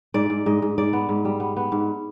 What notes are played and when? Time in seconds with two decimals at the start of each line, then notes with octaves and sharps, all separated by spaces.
0.14 G#2 D5
0.30 G#2
0.46 G#2 D#5
0.62 G#2
0.78 G#2 D5
0.93 B3
1.09 G#2
1.25 G3
1.40 B3
1.57 B3
1.72 G#2